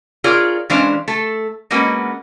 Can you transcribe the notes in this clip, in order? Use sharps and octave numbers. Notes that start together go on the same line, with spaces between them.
F4 G#4 A#4 C#5 D5
E3 G#3 C#4 D4 C5 F5
A3 A4
G#3 A#3 B3 C#4 F#4